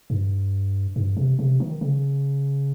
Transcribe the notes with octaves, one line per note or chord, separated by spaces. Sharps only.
G2
G2
C3
C3
D#3
C#3